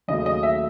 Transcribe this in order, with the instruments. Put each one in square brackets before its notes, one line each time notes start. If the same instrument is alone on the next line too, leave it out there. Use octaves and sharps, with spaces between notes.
[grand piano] D#2 C#3 F#3 A3 [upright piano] D#5
[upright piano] D#5
E5